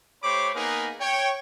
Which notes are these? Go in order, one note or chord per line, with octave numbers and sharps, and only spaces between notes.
A3 G4 C5 C#5 B5 D6
A#3 B3 D#4 G#4 A#4 B4
C#5 G5